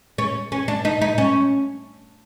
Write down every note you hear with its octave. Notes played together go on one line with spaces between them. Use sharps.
C#4
C#4
D4
D#4
D#4
C#4